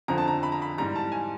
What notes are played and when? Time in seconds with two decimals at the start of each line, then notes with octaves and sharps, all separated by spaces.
0.08 F2 D3 F3 A#5
0.18 A5
0.28 A#5
0.43 B5
0.52 A#5
0.62 B5
0.78 G#2 E3 G3 A#5
0.96 A5
1.12 G#5